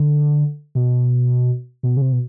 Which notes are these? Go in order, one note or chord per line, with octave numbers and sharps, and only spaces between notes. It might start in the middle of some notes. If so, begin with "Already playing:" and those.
Already playing: D3
B2
B2
C#3
C3
B2